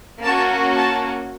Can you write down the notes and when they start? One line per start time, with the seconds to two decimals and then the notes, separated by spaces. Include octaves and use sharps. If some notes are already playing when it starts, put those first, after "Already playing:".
0.21 A#3 C#4 F#4 A5
0.76 A5